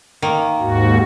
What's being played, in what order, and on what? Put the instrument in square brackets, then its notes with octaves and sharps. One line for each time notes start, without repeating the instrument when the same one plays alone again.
[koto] D#3 A#3
[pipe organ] D#2 G#2 F#4